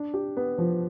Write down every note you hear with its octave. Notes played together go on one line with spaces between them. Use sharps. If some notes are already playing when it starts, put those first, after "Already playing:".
Already playing: D4
G4
B3
F3